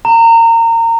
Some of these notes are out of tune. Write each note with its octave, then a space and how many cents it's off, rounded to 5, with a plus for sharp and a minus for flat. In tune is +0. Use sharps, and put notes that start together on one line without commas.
A#5 -25